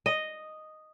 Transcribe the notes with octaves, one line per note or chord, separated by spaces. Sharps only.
D#5